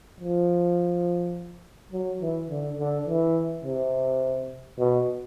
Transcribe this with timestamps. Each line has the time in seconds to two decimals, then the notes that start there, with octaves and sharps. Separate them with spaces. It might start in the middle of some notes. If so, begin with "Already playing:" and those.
0.20 F3
1.92 F#3
2.21 E3
2.49 D3
2.78 D3
3.07 E3
3.64 C3
4.78 B2